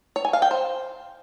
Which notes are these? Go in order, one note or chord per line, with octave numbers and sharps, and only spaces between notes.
C#5
G#5
F5
G5
C5